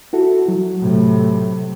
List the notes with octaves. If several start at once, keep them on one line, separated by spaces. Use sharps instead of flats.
E4 F#4 A4
F#3
A2 C3